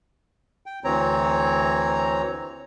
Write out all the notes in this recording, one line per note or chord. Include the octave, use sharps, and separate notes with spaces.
G5
D2 E3 C4 C#5 A#5